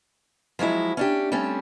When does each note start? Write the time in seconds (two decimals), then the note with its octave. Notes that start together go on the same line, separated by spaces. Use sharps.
0.59 F3 F#3 G#3 E4
0.97 C#4 D4 G4
1.32 G3 A3 C4 C#4